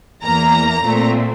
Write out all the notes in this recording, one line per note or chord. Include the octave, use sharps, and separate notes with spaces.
E2 E3 A#3 A#5
A#2 A3 C4